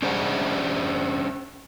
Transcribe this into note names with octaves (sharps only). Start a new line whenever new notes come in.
C#4 D4 G#4 C5 F#5